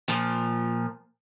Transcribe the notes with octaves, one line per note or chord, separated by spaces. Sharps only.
A#2 F3